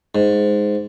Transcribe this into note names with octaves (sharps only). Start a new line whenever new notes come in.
G#2